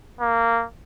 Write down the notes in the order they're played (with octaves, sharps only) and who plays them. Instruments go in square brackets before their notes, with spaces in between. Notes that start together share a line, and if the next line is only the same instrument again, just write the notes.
[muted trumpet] A#3